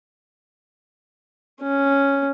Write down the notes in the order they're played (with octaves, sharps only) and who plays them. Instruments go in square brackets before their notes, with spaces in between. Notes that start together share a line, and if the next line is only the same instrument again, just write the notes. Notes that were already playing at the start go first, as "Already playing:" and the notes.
[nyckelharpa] C#4